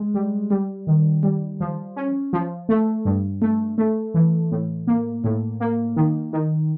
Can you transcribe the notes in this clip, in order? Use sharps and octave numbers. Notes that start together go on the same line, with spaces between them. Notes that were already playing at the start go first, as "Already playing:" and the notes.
Already playing: G#3
G3
G3
D#3
G3
F3
C#4
F3
A3
G2
A3
A3
E3
A2
A#3
A2
A#3
D#3
D#3